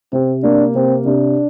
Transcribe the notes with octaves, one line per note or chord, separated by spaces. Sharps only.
C3 C4
A#3 D4
C3 C4
C3 D4